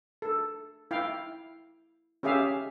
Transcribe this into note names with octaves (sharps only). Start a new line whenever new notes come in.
A4
E4 F5 G5
C#4 G4 G#4 E5 F5